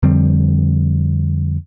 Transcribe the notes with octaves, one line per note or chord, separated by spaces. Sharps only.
F2 D3 G3 C4